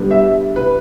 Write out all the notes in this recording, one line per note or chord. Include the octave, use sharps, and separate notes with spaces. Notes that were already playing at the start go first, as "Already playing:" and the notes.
Already playing: D3 G3 B3 D4
E5
B4